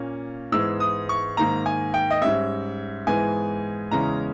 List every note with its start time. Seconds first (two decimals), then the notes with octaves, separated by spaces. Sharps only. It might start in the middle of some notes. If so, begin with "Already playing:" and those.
Already playing: A#2 A#3 C#4
0.52 G#2 E3 G#3 B3 E6
0.80 D#6
1.09 C#6
1.37 G#2 D#3 A#3 A#5
1.66 G#5
1.94 G5
2.10 D#5
2.22 G#2 G3 C#4 E5
3.07 G#2 E3 G#3 B3 G#5
3.91 E2 C#3 G#3 C#4 A#5